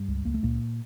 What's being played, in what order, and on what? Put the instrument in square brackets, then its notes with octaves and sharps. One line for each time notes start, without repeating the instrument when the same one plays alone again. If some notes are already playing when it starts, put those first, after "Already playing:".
Already playing: [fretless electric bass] G2 G3
C#2
C#2 A#3
A3
C#2 A#2 A#3